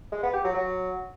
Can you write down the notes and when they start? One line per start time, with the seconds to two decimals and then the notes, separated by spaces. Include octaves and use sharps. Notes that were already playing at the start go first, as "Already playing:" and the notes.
0.12 G#3
0.23 B3
0.34 G4
0.44 F#3
0.55 F#3